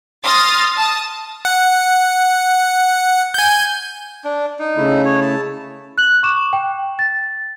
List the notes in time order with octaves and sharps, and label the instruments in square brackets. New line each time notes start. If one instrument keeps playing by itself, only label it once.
[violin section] C6 D#6 F6 A6 A#6
A5 D#6
[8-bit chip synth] F#5
G#5 G6
[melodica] D4
D#4
[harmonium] C#3 A3 E4
[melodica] C#5
A5
[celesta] F#6 F#7
C#6 D6 E7
G5
A6